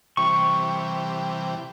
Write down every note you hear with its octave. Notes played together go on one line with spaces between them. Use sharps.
C3 E3 G3 C#6